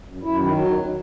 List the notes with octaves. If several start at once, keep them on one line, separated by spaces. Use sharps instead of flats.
F#2
F#2 E4
D#3
F#3
E2 D#4